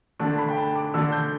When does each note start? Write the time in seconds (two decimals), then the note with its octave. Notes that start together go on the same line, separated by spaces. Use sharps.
0.19 D3 A3 D4 A5
0.38 B5
0.49 G5
0.57 A5
0.76 D6
0.94 D3 A3 D4 E6
1.12 G6